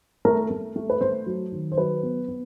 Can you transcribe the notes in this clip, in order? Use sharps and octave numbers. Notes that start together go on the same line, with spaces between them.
A3 A#4
A3
A3
B4
A3 C5
F#3
D#3
C5
F#3 B4
B3
B3